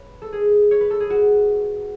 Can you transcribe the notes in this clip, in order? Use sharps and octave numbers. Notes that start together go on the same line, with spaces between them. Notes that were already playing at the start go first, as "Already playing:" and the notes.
Already playing: B4 C#5
A4
G#4
C#5
B4
A4
G#4
F#4